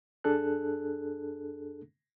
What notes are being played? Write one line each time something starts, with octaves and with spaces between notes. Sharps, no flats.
F#2 D4 G#4 A4 F#6